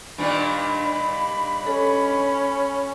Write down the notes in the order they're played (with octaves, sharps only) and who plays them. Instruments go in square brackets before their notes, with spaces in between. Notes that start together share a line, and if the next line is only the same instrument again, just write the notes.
[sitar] G2 A#2 D#3 [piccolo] B5
[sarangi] C#4 [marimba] A4